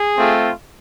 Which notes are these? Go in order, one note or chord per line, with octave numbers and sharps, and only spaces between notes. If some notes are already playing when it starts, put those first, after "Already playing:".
Already playing: G#4
A3 C4 F4